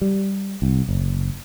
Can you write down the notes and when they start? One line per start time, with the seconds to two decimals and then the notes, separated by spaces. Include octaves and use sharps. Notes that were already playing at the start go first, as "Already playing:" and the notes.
0.01 G3
0.62 C2
0.89 F#1